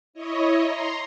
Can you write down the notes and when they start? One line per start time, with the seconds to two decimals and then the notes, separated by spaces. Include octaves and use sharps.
0.13 E4 C#5 D#5
0.63 A#5 C6